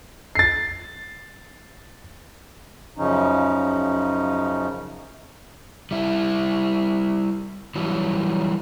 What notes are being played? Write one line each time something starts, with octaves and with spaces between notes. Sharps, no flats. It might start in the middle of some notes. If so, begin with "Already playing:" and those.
A6 C7
F#2 C#3 F3 C#4 D#4
G3 E4
E3 F#3 G3